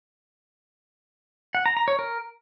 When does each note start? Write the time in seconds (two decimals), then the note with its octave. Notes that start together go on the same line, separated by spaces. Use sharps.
1.55 F#5
1.66 A#5
1.77 A#5
1.88 C#5
1.99 A#4